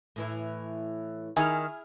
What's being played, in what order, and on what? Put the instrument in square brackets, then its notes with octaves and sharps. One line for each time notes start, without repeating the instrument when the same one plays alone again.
[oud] A2 E3 E4
[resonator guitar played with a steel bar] D#3 [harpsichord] E4 G#4 [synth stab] G#5 F6